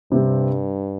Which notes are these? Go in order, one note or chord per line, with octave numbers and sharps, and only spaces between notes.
G2 C3 G3 C4